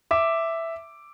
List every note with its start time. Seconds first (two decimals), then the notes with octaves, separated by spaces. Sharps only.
0.11 E5 D6